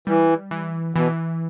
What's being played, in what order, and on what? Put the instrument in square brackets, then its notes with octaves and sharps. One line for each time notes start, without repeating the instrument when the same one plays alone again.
[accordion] E3 [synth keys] G3
[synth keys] E3
[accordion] B2 [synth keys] E3